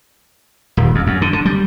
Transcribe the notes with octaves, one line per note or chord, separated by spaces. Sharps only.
D#1
F2
F#2
D3
D3
G3